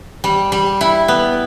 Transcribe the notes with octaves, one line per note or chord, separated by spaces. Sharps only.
G3
G3
E4
B3